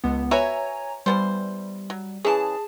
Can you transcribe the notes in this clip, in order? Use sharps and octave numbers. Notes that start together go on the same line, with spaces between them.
C#2 B3
F#4 B4 C#5 E5 G#5 A#5
E3 G3 B3 C5
F#3
E3 C#4 G#4 A5